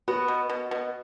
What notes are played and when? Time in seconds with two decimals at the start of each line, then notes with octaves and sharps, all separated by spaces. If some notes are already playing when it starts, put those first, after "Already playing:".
0.08 B3 F#4
0.28 B2
0.50 B2
0.71 B2